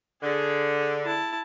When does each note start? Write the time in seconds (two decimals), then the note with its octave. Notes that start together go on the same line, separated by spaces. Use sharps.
0.22 D3 G#4
1.04 E4 A5